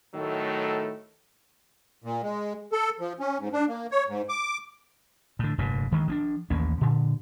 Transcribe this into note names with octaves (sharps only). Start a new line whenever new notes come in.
A2 D#3 F#3 A3 A4
A#2
G#3
A4
F3
C#4
G#2
D4
A#3
C#5
G#2
D6
A2 D3
F1 G2 A#2
D2 D#3 G#3
F3 C4 D4
A1 D#2 A#3 C#4
A#2 D3